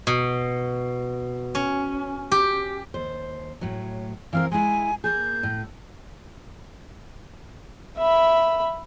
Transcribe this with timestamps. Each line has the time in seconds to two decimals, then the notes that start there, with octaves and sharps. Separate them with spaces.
0.07 B2
1.55 C#4
2.32 G4
2.94 D#2 C5
3.61 A2 F#3
4.33 E3 C4 A#4 F5
4.52 G#3 E4 G#5
5.04 A#3 G#4 G6
5.43 A2
7.98 E5 B5